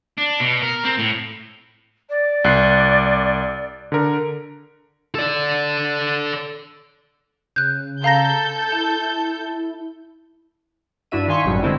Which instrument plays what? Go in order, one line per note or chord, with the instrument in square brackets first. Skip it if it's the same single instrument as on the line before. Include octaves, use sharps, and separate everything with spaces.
[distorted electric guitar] D4
B2
A#4
C4
A2
[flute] D5
[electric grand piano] C2 F#6 C7
D3 A#4
[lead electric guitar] A4 D5
[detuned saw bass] C#3 [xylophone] F#6 G6
[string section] A4 G6 [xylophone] F5 A#5 A#6
[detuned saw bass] E4 [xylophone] A5
[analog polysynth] G2 D4 E4 F#4 E5 D#7
D#3 F5 G#5 C6 C#6 B6
G#1 F#2 A2 F#3 G3
D3 G#3 C4 E4